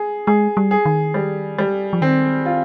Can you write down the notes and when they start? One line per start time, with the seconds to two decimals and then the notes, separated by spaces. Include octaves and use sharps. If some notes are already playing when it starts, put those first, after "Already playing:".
Already playing: G#4
0.27 G#3 G#4
0.57 G3
0.71 G#4
0.85 D#3
1.14 G3
1.59 G3
1.93 F3
2.01 D#3 C4
2.46 F4